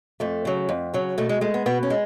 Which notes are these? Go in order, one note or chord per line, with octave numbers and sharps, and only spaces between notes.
F2 A3
C#3 F#3
F2
C#3 F#3
B2 A3
G#3
G#3 A3
B3
B2 B3
C#4
G#3